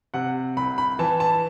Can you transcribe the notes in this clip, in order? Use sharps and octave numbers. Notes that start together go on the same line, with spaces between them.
C3 F#5
C2 B5
B5
E3 A5
A5